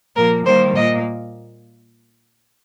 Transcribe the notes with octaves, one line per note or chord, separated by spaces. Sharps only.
A#2 F3 A#3 A#4
D#3 G3 A#3 C5
A#2 A#3 D#5